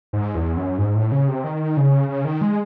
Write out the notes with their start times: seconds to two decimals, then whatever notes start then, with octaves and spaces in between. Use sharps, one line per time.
0.13 G#2
0.35 E2
0.57 F#2
0.78 G#2
0.96 A2
1.12 C#3
1.28 C3
1.44 D#3
1.77 C#3
2.09 C#3
2.25 D#3
2.41 G#3